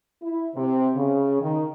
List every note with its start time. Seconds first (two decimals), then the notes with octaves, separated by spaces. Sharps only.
0.22 E4
0.56 C3
0.96 C#3
1.42 D#3